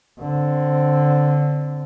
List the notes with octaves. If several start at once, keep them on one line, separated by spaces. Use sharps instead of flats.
D3 C4